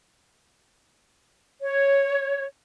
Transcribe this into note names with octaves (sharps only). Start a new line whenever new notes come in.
C#5